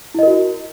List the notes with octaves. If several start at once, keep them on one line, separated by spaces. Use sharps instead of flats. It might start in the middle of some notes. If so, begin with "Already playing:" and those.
E4 F#4 A#4 D#5